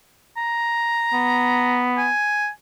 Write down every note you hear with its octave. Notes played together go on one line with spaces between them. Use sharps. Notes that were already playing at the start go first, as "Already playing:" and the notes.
A#5
B3
G#5